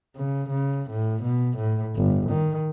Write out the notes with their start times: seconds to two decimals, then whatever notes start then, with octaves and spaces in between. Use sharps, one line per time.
0.16 C#3
0.49 C#3
0.91 A2
1.22 B2
1.57 A2
1.96 G1
2.30 D#3